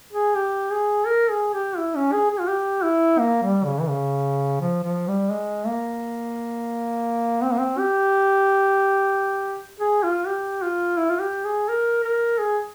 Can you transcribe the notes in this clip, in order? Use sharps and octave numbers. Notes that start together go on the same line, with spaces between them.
G#4
G4
G#4
A#4
G#4
G4
E4
C#4
G#4
G#4
F4
G4
E4
A#3
G3
C#3
E3
C#3
F3
F3
G3
G#3
A#3
C4
A#3
C4
G4
G#4
F4
G4
F4
E4
F4
G4
G#4
A#4
A#4
G#4